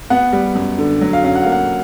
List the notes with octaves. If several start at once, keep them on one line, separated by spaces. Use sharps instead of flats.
B3 F#5
G3
F#2
D3
F#3
F5
C#4 F5
F#5
F5
A#3
F#5